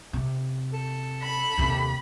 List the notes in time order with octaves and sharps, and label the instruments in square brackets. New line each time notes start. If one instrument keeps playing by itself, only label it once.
[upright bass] C3
[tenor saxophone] A4
[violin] B5
[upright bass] D#2 C3